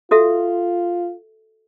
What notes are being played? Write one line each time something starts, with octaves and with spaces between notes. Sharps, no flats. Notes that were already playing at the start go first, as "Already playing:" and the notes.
F4 F#4 A4 E5